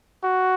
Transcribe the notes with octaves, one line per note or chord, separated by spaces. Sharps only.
F#4